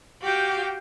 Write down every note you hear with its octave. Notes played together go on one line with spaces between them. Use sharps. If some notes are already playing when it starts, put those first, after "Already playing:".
F#4 G4 F5 G5